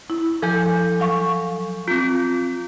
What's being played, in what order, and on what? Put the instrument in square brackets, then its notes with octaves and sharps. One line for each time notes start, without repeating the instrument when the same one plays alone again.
[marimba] E4
[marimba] F3 [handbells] A4 G#5 G6
[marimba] F#3 F5 C#6
[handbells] C4 F4